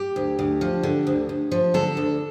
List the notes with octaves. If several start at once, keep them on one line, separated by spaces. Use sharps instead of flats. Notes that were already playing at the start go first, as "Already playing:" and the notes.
Already playing: G4
D2
D2
F3
D3
D2
D2
F3
D3 A4
D2